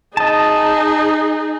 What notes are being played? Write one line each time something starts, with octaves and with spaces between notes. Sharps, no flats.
D#4 G#4 D#5 A5